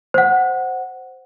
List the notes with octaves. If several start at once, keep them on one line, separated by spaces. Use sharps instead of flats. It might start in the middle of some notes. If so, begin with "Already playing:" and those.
C5 F#5